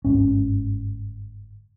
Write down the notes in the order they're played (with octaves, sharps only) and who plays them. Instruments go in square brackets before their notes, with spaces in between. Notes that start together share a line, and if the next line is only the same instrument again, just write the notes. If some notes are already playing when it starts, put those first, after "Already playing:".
[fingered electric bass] G1 G#2 C#4